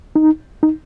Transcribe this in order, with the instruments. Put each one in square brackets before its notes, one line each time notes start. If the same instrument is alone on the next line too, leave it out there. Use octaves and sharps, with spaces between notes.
[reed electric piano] D#4
D#4